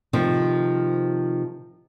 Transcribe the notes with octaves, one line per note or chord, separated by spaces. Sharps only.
C3 D#3 F3 A3 C4